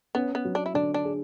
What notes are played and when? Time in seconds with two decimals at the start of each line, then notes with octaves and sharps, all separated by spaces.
0.15 B3 C#4
0.35 B3
0.45 F#3
0.55 D4
0.66 E4
0.74 D3 D4
0.94 D4
1.05 G#4